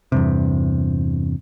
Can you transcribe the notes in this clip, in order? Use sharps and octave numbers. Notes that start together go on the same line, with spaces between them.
E2 G2 C3